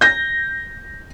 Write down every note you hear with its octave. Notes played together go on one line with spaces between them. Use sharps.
G6 A#6